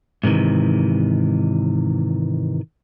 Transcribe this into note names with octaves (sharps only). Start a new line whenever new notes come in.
G#2 C3 D#3 E3